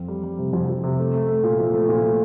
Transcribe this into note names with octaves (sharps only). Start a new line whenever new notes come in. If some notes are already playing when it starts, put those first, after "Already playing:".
Already playing: F2 C4
G3
G3
C3
F2
F2
C3
A3
A3
A3
A#2
F3
A3
A#2
A3